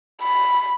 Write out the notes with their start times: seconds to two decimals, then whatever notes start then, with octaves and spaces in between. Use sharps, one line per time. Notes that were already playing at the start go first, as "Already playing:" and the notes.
0.22 B5